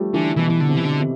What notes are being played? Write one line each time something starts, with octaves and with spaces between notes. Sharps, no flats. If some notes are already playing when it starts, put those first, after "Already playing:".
Already playing: F3 G3 A3
D3 E3
B2 E3
E3
D3
C3
E3
D3
C3